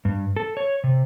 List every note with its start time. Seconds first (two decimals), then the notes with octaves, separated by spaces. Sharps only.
0.05 G2
0.36 A4
0.57 C#5
0.84 C3